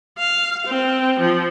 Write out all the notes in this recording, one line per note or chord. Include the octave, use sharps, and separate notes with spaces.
F5
C4
F3